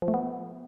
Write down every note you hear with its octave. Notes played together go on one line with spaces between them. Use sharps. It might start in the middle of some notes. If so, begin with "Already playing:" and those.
F3
A3
B3